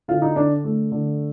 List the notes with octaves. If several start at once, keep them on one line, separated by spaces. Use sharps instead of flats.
D3 F4
D#4
D3 D4
A3
D3